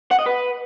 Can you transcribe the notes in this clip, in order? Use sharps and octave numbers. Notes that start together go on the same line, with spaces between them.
F#5
D#5
B4